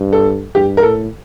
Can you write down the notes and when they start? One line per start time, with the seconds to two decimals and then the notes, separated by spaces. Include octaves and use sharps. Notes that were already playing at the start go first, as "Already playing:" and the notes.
Already playing: G2
0.13 A4
0.55 G2 G4
0.77 A#4
0.83 A2 A4